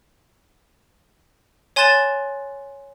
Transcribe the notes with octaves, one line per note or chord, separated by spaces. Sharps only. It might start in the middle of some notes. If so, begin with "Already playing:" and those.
C#5 G#5 C6 F#6 A6 E7